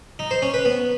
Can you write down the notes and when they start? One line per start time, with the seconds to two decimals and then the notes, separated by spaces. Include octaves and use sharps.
0.19 D#4
0.31 C5
0.42 C#4
0.54 B4
0.65 B3